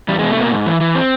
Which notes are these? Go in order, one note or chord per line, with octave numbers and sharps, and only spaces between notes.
E2 G3
B2 G#3
A3
B2 A#3
G#2
E3
E3
C4